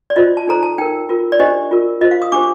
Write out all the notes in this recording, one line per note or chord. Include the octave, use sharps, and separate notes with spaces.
D5
F4 C5 D#5
A5
D#4 A4 C5 A#5
A5
D#4 A#4 G5
F4 A#4
D5
D4 G4 C5 D#5
F4 A#4
F4 C5 D#5
F5
D#6
D4 G4 C5 D6